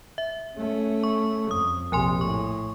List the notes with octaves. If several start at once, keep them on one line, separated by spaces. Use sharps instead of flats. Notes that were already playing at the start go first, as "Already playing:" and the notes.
E5
A3 C#4
C#6
F2 D#6
A#1 C3 F3 G#5 C6
A2 C#6